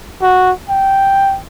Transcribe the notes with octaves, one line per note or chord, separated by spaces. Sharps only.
F#4
G5